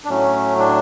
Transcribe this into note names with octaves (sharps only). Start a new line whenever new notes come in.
D4
A2 F#3 A3 C#4
D4